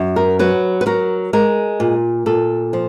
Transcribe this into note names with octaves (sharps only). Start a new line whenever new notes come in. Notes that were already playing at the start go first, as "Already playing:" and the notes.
Already playing: F#2
A#4
F#3 B4
B4
F#3 A#4
G#3 A#4
A#2
A#2 A4
F3